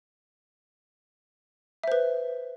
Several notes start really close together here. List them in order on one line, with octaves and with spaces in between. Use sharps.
E5 C5 B4